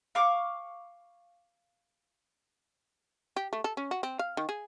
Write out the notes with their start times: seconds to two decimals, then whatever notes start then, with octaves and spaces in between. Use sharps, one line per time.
0.15 F5 C#6 D6
3.37 G4
3.53 A3
3.64 A4
3.77 C#4
3.91 F#4
4.03 C4
4.19 F5
4.37 D#3
4.49 G#4